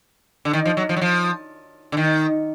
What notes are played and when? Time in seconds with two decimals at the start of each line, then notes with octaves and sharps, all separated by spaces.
0.45 D3
0.53 D#3
0.65 F3
0.77 F#3
0.89 F3
0.96 F#3
1.01 F3
1.92 D3
1.97 D#3